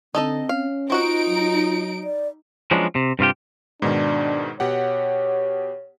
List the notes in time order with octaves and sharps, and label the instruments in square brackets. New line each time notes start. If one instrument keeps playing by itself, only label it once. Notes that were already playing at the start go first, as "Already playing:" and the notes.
[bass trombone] D3 [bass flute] C4 [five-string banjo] D#4 A4 D#5
[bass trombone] C#4 [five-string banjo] F5
[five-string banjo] C4 F#4 F#5 [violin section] D#4 D7 [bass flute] F4
[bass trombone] F#3
[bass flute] D5
[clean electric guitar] F3 F#3 G#3 B3 C#4 D4
C3
G2 C3 F4 G4
[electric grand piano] G#2 B2 D#3 [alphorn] D4
[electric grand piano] B2 G4 F#5 [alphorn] C#5